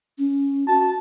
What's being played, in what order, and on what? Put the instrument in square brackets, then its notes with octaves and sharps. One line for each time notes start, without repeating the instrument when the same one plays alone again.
[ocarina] C#4
[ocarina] F#4 [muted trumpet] A5